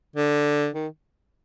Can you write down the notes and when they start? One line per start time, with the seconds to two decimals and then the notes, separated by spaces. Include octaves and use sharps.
0.16 D3
0.74 D#3